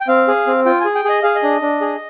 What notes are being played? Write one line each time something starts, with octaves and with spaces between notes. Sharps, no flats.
G5
C4 F5
G#4
C4
F4 G5
G#4 G#5
G5
G#4 D#5
G#4 F5
D#5
D4
D4
G#4